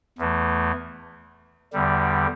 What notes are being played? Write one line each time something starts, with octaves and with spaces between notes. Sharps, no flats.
E2 E3 A3
E2 D3 G3